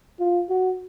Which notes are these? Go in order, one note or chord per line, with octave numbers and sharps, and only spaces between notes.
F4
F#4